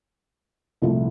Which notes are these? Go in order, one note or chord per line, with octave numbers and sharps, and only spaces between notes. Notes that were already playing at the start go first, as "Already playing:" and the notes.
C2 A#2 F3 A3